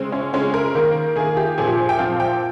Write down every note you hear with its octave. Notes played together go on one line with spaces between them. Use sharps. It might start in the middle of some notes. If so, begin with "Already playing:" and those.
Already playing: C#3 G#3 C4
C#4
C#3 G#3 C4 C#4
A#4
D#3 A#3
D#3 A#3 G#4
G4
A#2 F3 C4 G#4
G4
G#4
G5
A#2 F3 C4 F5
G5